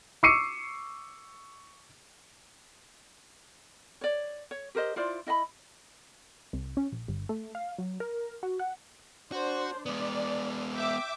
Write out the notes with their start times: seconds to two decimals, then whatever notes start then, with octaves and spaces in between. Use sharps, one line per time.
0.23 C#6 D6 E6 C7 C#7 D#7
4.01 C#5 D5
4.51 C#5
4.75 G4 A#4 C5 D#5
4.96 E4 F4 C5 D5
5.27 E4 D#5 F#5 B5
6.53 C2
6.77 C#4
6.92 A#1
7.08 G1
7.29 A3
7.55 F5
7.78 F#3
8.00 A#4
8.43 F#4
8.59 F#5
9.32 D4 F#4 C5
9.86 G#3 B3 D5
10.75 E5 G5 D6